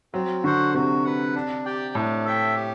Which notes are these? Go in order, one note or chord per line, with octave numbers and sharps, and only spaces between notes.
F#3 C4
D3 F#4 C5 F#5
C3 F#4
B4 F#5
D4
G4 D5 G5
A2 D4
A4 E5 G5
G4